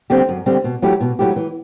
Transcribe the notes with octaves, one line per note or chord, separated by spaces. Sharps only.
D3 G3 C4 G4
F#2
D3 G3 C4 G4
B2
F#3 A3 E4 G4
B2
F#3 A3 E4 G4
E3